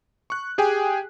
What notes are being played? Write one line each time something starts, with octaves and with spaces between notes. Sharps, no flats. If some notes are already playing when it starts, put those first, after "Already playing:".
C#6 F#6
G4 G#4 G5 G#5